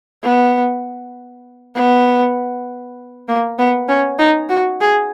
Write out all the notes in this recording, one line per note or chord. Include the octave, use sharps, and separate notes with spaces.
B3
B3
A#3
B3
C#4
D#4
F#4
G#4